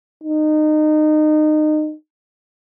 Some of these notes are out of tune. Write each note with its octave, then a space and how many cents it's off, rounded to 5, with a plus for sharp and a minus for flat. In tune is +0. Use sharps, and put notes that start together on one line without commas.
D#4 -25